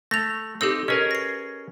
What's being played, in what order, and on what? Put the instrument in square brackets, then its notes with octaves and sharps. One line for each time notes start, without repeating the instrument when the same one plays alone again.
[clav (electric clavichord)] A3 [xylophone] A#6 F7
[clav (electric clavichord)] C4 D#4 [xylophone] G4 A4 E6
[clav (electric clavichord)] C#4 G#4 A#4 [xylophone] B4 D#5
[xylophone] A#6 C7